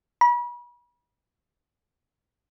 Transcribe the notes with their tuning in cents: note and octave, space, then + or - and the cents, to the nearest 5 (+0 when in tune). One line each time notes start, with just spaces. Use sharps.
B5 -35